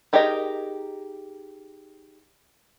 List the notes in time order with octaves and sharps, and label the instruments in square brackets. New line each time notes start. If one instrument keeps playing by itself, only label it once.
[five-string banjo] D#4 G4 G#4 A#4 D#5